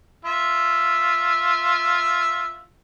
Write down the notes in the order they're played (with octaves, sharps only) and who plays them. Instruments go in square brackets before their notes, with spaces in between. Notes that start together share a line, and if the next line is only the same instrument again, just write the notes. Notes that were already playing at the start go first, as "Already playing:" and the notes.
[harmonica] F4 E5